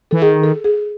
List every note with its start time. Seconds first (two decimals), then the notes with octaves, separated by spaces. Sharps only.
0.11 E3 A4
0.22 D#3 G#4
0.43 A4
0.64 G#4